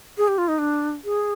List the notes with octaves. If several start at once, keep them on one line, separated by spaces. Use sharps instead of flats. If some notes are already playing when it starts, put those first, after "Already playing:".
G#4
G4
F4
D#4
D4
G#4